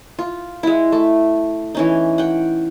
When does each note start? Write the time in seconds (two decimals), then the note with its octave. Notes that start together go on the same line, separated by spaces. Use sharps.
0.19 F4
0.63 G#3 E4
0.92 A3
1.75 E3 C#4 D#4
2.18 F#5 G5